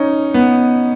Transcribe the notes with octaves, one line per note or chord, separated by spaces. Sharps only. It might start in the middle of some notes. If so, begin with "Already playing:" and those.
Already playing: C#4 D#4
B3